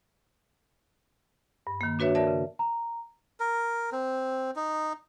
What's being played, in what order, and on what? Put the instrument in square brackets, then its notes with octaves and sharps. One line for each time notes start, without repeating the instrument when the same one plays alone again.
[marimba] G2
D#3 A#3
D4 F#4 B4 C#5 E5
A#4 D5 E5 A5
C#3
[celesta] A#5
[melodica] A#4
C4
D#4